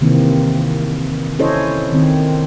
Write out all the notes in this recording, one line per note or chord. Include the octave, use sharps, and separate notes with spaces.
C3 D#3 E3 A#3 C4
C#4 E4 A4 C5 C#5 D#5
D#3 C4